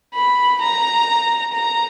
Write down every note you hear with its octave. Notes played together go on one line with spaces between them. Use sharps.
B5
A#5
A#5